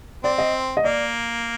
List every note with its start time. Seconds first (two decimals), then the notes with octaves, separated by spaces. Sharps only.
0.24 C4 D5
0.38 D#5
0.77 D#5
0.83 A#3 D5